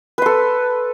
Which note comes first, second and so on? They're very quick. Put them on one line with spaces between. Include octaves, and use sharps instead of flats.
B4 C6 A4